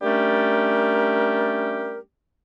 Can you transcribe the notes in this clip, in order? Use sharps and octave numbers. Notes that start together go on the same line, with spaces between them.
G3 A3 C#4 D4 G4 A#4